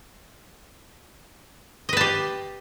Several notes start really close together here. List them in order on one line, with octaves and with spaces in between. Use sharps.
D#5 B4 A5 G4